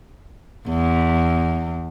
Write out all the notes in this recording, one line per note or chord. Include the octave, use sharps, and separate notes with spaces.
E2